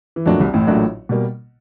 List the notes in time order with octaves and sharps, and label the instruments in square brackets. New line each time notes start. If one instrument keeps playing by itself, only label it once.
[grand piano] E3
[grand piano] F2 F3 [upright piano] A#2 F#3 A3 D4 F#4
[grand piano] C2 C3
A1 A2
[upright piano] A#2 F#3 A3 D4 F#4
B2 G3 A#3